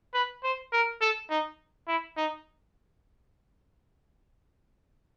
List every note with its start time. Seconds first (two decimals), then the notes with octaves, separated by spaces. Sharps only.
0.14 B4
0.43 C5
0.72 A#4
1.01 A4
1.30 D#4
1.88 E4
2.17 D#4